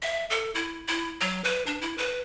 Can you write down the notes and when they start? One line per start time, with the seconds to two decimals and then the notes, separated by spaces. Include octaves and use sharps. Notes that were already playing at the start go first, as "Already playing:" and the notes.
0.02 E5
0.30 A4
0.55 E4
0.88 E4
1.21 F#3
1.44 B4
1.66 D4
1.82 E4
1.98 B4